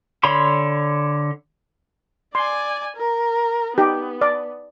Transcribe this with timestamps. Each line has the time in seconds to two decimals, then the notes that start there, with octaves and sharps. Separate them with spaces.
0.23 D3 C#5 B5 C6
2.35 D5 G#5 C6
2.96 A#4
3.78 B3 D#4 G4
4.21 D5